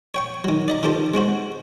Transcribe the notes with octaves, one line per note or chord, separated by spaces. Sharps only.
C#5 G5 C#6
D#3 F#3
D5 D#5 A#5
D#3 F3 G4 A4 C5
G#3 C4 F#4 C5